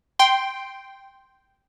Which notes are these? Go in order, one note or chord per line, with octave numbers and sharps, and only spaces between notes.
G5 C6